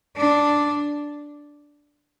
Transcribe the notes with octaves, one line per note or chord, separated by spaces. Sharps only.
D4